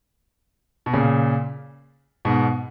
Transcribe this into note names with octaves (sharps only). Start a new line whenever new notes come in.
B2
A#2 C#3
G#2 B2